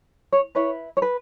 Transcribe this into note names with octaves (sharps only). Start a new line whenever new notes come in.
C#5
E4 B4 C#5
C#5
B4